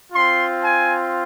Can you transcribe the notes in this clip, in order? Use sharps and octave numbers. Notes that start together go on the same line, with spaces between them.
C4 F4 C6
G#5